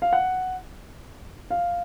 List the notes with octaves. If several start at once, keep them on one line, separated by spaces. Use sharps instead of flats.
F5
F#5
F5